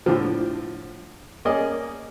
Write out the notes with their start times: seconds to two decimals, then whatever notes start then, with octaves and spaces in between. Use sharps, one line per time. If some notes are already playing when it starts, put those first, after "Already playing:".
0.06 A2 D3 F3
1.45 A#3 C#4 G#4 D5 D#5